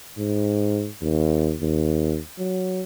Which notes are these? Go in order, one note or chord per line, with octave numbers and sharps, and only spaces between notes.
G#2
D#2
D#2
F#3